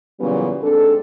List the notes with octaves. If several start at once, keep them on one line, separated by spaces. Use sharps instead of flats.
A#2 C#3 E3 F#3 G3 B3
G#2 C4 D4 A4